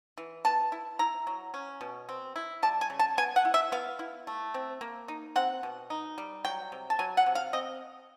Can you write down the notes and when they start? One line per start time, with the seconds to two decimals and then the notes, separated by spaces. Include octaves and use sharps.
0.18 E3
0.45 B3 A5
0.72 E4
0.99 E4 A#5
1.27 F#3
1.54 C#4
1.81 B2
2.09 C4
2.36 E4
2.63 G3 A5
2.81 G#5
2.90 C#3
2.99 A5
3.18 B3 G#5
3.36 F#5
3.45 E4
3.54 E5
3.72 B3 F5
3.99 E4
4.27 A3
4.54 C4
4.81 A#3
5.08 D#4
5.36 C4 F#5
5.63 B2
5.90 D#4
6.18 G3
6.45 F#3 G5
6.72 C3
6.90 A5
6.99 F#3 G#5
7.17 F#5
7.26 C3
7.35 F5
7.53 C4 D#5